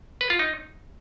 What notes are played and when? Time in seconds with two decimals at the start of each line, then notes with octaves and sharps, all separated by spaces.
0.21 B4
0.30 F4
0.39 D#4